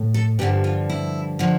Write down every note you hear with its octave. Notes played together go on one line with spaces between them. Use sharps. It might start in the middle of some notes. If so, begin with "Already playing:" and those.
Already playing: A2
A4
G2 D3 F3 G4
F4
E4
D3 F3